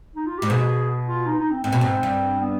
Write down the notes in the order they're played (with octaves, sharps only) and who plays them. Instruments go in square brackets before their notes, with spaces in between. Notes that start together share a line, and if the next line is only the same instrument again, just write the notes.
[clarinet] D#4
F4
[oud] G#2 [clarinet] G4
[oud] B2 [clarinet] G#4
[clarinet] F4
D#4
D#4
C4
[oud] G#2 [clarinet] C4
[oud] B2
G#2
G2
[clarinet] B3